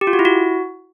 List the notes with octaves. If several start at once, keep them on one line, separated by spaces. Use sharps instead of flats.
G4
F4
F#4
E4
F#4